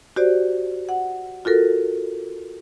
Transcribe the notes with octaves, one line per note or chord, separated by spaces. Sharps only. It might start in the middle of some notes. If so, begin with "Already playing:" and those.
F#4 G4 C5 D5
F#5
F4 F#4 A4 A#4